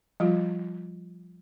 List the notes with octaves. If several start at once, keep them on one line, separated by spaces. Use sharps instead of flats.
F3 G3 F4